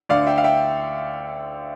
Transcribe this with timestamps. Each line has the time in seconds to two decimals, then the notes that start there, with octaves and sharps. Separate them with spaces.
0.09 D2 D3 D5 F5
0.27 E5 G5
0.38 F5
0.44 E5 G5